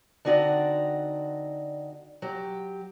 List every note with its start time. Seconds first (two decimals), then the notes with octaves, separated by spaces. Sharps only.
0.25 D3 C4 D#4 F#4 D5
2.22 F#3 G4